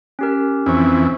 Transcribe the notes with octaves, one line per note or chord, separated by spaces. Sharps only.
C#4 G4 A#4
F2 E3 C4 C#4 C#6